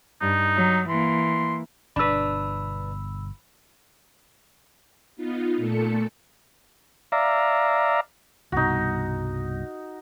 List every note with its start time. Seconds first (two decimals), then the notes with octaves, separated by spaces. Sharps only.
0.21 G2 D#4
0.56 F#3
0.89 E3 A#3 C6
1.96 G1 B2 D4 B4 B5 E6
5.16 B3 D#4 F4
5.57 A#2 A3 A4 C#7
7.12 D5 E5 F5 A#5
8.52 C2 G2 B2 D#4 F#4